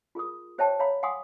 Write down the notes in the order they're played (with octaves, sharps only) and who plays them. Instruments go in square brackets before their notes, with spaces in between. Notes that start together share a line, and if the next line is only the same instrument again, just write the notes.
[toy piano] F4 G#4 A#4 D#6
G4 C5 C#5 E5 G5 A5
C#5 E5 F5 A#5 B5
F5 F#5 G#5 C6 D6 D#6